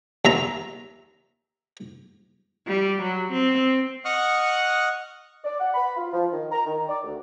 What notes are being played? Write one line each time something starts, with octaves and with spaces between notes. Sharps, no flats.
D#2 E5 A#5
G3
F#3
C4
D#5 F#5 C#6 D#6 F6 F#6
D5
F#5
B5
F4
F3
D#3
A#5
D#3
D5
D2